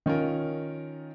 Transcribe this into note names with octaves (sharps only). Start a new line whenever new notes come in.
D#3 C#4 F4 A#4